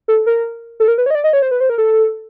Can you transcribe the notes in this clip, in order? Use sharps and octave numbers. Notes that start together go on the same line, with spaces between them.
A4
A#4
A4
A#4
B4
C#5
D#5
D5
D#5
C#5
C5
B4
C5
A#4
A4